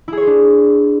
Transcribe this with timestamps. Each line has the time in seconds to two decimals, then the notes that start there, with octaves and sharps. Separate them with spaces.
0.08 E4
0.13 G#4
0.17 C#5
0.22 C5
0.27 D4